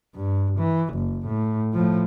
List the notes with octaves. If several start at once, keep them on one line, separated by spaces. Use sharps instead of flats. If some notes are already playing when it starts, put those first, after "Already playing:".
G2
E3
F#1
A2
A2 F3